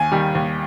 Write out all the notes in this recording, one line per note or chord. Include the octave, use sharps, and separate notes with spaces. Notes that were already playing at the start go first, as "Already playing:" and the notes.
Already playing: D#2 G#5
D#3 G3
D#2